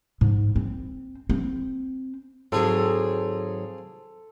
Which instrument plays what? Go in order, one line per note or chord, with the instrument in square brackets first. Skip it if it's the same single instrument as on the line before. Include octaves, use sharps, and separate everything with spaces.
[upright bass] G#2
C4
C4
[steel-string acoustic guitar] G#2 D#3 F#3 [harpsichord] C4 F4 G#4 [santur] A4